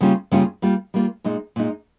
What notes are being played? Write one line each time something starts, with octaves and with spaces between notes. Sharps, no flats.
C#3 G3 A#3 C#4 F4
C#3 G3 A#3 C#4 F4
G3 A#3 F4
G3 A#3 F4
A#2 G#3 D#4
A#2 G#3 D#4